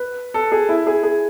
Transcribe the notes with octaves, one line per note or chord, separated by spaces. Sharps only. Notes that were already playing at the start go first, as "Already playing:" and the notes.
Already playing: B4
A4
G#4
E4
G#4
G#4